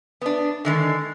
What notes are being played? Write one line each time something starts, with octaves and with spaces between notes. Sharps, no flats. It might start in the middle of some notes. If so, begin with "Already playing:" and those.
B3 D4
D3 D#3 G#3